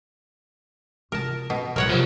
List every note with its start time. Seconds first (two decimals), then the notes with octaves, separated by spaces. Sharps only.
1.12 C3 F4 A#4 A5
1.50 B2 C#4
1.76 B1 A#2 A#4 C#5 F#5
1.89 G2 C3 F3 G3